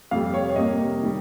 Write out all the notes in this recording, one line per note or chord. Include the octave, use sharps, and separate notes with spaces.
F2 C3 G3 F5
C#5
C#5
C3 G3 A#3 D#5
D#3 G3